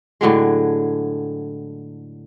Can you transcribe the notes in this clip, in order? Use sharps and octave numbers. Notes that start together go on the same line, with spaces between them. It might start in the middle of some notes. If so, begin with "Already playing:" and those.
A2 D3 F#3 G#3